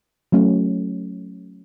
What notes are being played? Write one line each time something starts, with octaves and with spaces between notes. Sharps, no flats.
F#3 A3 C#4